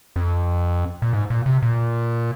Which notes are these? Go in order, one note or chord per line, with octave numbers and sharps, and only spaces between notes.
F2
A#2
G#2
A#2
C3
A#2